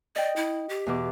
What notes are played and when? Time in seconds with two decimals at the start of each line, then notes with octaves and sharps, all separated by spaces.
0.16 D5 D#5 G5
0.36 E4
0.69 G4
0.86 E2 B2 D6